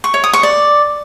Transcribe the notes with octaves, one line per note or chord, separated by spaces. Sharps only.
C#6
C#5
D#6
C#6
D5